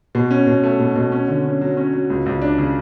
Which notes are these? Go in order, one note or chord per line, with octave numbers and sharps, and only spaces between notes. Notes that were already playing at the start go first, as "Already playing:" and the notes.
B2
C#4
B2
A3
B2
B2
C#4
D3
C#4
F#3
C#4
F#3
C#2
C#2
D4
C#3